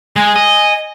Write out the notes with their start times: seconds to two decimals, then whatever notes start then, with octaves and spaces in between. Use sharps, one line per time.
0.16 G#3 G#5
0.36 D#5